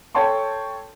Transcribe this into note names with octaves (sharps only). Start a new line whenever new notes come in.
A4 C#5 G5 A5 C6 C#6